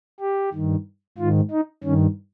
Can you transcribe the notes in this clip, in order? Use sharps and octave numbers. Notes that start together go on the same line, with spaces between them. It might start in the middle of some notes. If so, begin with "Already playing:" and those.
G4
G2 D#3
G#2 D#3 F4
D#4
G2 D#3 C#4